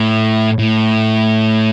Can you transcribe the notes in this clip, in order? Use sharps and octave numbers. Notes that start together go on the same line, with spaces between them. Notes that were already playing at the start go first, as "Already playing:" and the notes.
Already playing: A2
A2